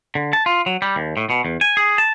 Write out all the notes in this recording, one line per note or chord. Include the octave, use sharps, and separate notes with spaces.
D3
A5
F4
F#3
G3
D#2
A2
B2
E2
G#5
G#4
A5